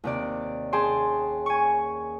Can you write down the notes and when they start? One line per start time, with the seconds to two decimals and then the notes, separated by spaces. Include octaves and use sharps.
0.04 D#2 C3 D5
0.73 C#4 G#4 G5 A5 C6
1.46 G#5 C#6